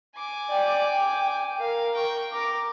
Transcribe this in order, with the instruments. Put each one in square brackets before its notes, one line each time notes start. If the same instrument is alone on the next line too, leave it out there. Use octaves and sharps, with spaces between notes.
[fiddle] G#5 D6
[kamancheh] D5 G5
G5
[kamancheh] A#4 [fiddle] F5
[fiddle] G5 C#6
[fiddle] A#4 [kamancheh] D6